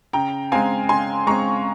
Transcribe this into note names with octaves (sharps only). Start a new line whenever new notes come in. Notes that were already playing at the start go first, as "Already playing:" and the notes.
C#3 G5 A#5
G#3 C4 F5 G#5
C#3 G#5 C6
G#3 C4 A#5 C#6